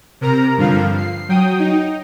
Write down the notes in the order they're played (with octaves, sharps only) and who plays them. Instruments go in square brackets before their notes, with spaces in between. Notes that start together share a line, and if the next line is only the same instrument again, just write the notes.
[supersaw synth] C3 A#4 A#5
G2 D3 F3 F5
C7
F#3 G5 D#6
D#4